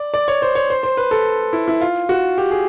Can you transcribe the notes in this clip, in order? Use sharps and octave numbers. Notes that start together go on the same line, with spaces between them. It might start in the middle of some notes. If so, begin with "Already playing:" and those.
Already playing: D5
D5
C#5
C5
C#5
C5
C5
B4
A4
E4
E4
F4
F#4
G4
G#4